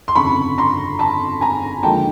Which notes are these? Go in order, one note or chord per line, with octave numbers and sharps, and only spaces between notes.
C6
G1 F2 C#3 B5 C#6
A#5 C6
A5 B5
G#5 A#5
D#2 D3 F3 G#3 G5 A5